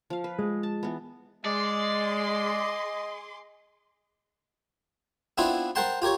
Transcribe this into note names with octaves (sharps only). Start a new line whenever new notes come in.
F3 F5
B4
G#3
A5
E3 B3
G#3 G#4 D5 D#5 C6 D6
B3 C4 D4 E4 F4 B4
A#4 C5 F#5 G5 A5 C6
F4 G4 A#4 C#5